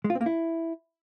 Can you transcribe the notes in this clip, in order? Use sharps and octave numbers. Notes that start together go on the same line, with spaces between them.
G#3
F4
C4
A#3
E4